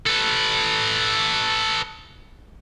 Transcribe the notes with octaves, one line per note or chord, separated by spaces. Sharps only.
A4 B4